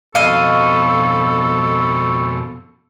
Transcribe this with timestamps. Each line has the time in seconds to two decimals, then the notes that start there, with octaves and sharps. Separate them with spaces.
0.15 F2 B2 C4 A4 D#5 F5 B5 C#6